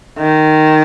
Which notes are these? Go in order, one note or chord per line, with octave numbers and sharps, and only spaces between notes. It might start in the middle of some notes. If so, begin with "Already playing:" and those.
D#3